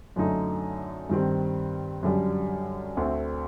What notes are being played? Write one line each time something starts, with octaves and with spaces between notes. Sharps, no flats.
F#2 D3 A3 D#4
G2 D#3 G3 C4
F#2 D3 G3
D2 D3 A3 C4